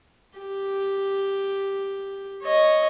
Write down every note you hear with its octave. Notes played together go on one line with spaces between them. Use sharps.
G4
C#5 D#5